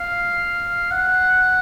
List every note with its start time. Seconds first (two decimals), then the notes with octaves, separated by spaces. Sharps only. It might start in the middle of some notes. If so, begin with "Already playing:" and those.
Already playing: F5
0.91 F#5